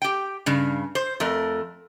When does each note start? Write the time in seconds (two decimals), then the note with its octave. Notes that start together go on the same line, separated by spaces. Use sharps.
0.02 G4 G5
0.46 G2 C#3
0.95 C5
1.20 F2 A3 A#4